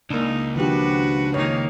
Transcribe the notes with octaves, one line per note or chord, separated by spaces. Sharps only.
C#2 A#3 D4 D#4
D#3 F3 D4 F#4 G4 B4
D#3 A#3 D#4 C#5